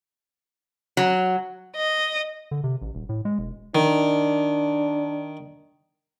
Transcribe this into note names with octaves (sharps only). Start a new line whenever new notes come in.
F#3
D#5
D3
C3
A1
D#1
A2
G#3
E1
D#3 D4